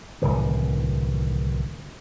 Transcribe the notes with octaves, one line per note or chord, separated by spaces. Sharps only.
D1 C2 D#3 E3